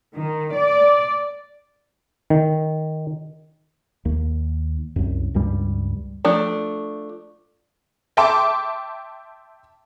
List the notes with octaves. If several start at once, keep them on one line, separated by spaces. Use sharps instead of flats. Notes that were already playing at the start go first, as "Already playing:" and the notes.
D#3
D5
D#3
D#2
C2 F#2
C#2 G2 G3
F3 A3 D4
E5 G5 A5 C6 D6